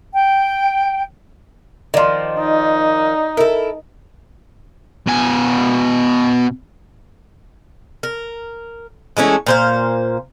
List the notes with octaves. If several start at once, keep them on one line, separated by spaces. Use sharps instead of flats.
G5
D#3 F3 D5 C6
D#4
E4 A4 A#4
B2 G#5
A#4
E3 G#3 A3 C#4
A#2 C5 F5